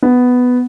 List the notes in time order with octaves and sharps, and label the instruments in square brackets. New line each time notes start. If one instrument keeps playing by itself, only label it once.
[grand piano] B3